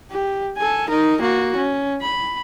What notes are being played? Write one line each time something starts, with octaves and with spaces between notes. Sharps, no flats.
G4
A4 G#5
D#4 A#4
A#3 F#4
C#4
B5